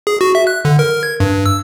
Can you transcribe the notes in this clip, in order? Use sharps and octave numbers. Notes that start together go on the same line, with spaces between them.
G#4
F#4
E5
F#6
D3
A#4
G#6
G2
E6